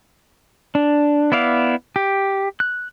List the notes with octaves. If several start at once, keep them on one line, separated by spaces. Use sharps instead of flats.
D4
B3 E4 D5 F5
G4
F#6